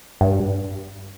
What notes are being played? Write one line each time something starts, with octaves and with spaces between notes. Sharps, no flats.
G2